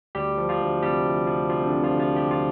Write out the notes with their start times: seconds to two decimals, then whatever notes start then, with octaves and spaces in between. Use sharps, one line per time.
0.15 D2 G3 G4
0.37 F3
0.49 F3 F4
0.60 D2
0.82 C3 G3 G4
1.04 D2
1.27 F3
1.49 D2 F3 F4
1.60 C4
1.67 D3 D4
1.72 C3
1.83 F3 F4
1.94 D2
2.00 F3 F4
2.16 F3 G4
2.31 F4